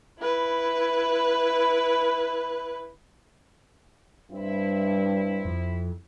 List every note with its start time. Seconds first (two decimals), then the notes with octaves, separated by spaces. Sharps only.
0.20 E4 B4
4.32 G2 C4 E4
5.45 F2